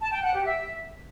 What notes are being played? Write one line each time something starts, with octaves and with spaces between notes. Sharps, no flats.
A5
G5
F#5
G4
E5